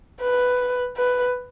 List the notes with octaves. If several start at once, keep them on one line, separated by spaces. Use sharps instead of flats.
B4
B4